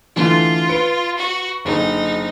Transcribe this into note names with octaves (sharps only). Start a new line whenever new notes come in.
D3 E3 A3 F4
B4 C#7 D7
F#4
F#1 D3 D#4